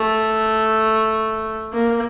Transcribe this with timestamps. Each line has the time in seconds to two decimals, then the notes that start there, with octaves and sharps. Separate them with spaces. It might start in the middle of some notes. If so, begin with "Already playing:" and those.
Already playing: A3
1.73 A#3